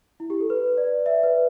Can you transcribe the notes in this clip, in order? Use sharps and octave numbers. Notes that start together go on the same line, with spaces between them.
E4
G4
A4
B4
D5
E5
B4